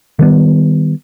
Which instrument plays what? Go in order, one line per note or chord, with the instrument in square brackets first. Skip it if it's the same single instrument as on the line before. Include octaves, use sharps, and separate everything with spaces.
[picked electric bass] D#3 G3 B3